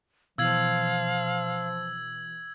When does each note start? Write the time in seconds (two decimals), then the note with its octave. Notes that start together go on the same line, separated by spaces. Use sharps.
0.38 B2 E3 F3 F5 E6 G#6 F#7